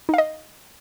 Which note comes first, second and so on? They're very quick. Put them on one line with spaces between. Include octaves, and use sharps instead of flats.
D#4 F5 D#5